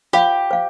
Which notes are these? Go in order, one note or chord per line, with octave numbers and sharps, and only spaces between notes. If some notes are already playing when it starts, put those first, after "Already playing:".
F4 G4 C5 F5
C5 F5